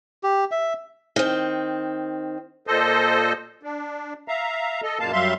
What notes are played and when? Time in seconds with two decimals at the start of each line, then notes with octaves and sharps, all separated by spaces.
0.23 G4
0.51 E5
1.16 D#3 C4
2.67 A#2 A4 C5 D#5
3.63 D4
4.28 E5 F5 A#5
4.83 A4 D#5
5.00 F#2 A#2 G#3 A#3 F5 A5
5.13 F#2 F#3 G3 E5 F5 C6